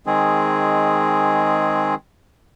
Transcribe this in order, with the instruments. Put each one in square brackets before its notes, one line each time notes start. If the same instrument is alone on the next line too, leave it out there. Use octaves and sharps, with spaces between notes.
[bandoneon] D#3 G#3 C4 G#4